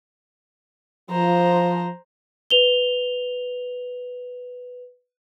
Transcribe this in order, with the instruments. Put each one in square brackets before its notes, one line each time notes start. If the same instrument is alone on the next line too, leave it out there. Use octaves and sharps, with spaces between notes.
[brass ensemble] F3 [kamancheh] C5 A#5
[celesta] B4 F7 G7